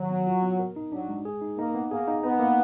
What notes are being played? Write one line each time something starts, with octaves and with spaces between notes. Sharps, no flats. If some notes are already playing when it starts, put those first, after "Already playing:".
Already playing: D#3 F#3
B3
F4
B3
A#4
D#4
F#3 D4
G#3
G#4
D#4
A#3 D#4
B3
A#3 G#4
D#4
B3 D#4
A#3